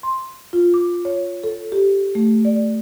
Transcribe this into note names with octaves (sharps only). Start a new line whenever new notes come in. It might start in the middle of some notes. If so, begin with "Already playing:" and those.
C6
F4
D6
C#5
A4
G4
A3
D5